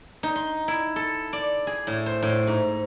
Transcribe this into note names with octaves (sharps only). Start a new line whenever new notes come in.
D#4
C6
E4
A4
D5
G#4
A2
C5
A2
G#2